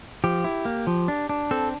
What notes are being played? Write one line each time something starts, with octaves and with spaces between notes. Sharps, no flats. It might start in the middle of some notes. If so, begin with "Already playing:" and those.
F3 G4
E4
A#3
F3
D4
D4
C4 A4